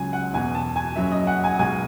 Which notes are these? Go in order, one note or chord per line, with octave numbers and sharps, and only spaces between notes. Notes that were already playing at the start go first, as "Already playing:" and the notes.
Already playing: C#2 C#3 F#3 G#5
F#5
E1 E2 B2 G#5
A5
G#5
F#1 F#2 C#3 F#3 E5
D#5
F#5
G#5
B1 B2 G#3 G#5